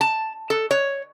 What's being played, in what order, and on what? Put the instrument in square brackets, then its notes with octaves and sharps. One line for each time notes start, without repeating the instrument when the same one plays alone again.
[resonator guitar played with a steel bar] A5
A4
C#5